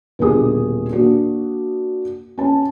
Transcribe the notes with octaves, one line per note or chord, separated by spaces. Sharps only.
D#1 B2 D3 G#4 D#6
A#3 D4 F#4
C#4 A5